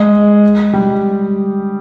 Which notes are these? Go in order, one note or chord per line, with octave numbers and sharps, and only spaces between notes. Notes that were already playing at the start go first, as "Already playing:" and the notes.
Already playing: G#3
G3